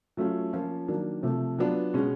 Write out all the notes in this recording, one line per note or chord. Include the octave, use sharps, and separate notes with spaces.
F#3 A3 C#4 F4
F3 A#3 C#4 F4
D#3 F#3 A#3 D4
C3 F3 A3
F#3 B3 D4 F4
B2 G#3 C#4